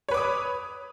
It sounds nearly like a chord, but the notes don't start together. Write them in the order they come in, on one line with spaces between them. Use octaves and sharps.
C#5 B4 D6 D#6